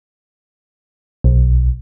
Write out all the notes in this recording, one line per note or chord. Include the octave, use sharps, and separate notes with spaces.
B1